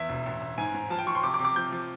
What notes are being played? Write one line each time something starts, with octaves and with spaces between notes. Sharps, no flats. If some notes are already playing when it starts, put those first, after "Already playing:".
Already playing: E2 E5
E1
A1
A1
G#2 G#5
G#2
F3 A5
G5
F3 C#6
C6
C3 D6
D6
C3
D6
F3 G6
F3